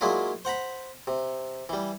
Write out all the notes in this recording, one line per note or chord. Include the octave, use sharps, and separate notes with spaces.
F#3 G#3 A#3 D4 E4 F4
C5 F#5 A#5 B5
C3
E3 G3